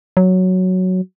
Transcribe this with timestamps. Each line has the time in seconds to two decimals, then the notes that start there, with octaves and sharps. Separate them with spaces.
0.17 F#3